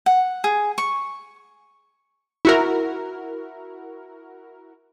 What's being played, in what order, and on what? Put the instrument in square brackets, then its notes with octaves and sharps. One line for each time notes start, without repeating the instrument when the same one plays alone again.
[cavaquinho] F#5
G#4
C#6
[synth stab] E4 F#4 A#4